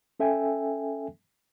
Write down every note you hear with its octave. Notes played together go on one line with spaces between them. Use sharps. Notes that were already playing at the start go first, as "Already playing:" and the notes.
C#4 A4 E5 G5 G#5